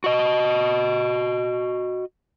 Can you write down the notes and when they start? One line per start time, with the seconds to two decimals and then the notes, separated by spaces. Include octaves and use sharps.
0.04 F#4 D#5